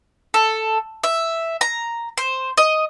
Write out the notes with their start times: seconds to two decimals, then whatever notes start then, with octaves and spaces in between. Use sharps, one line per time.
0.34 A4
1.04 E5
1.61 A#5
2.17 C5
2.57 D#5